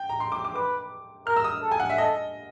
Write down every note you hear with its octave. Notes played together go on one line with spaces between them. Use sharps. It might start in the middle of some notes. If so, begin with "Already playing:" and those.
Already playing: G5
A#5
C6
D6
D6
B4 D6
A#4 F6
E6
D#6
A4
G#5
F#5
E5
A4 D#5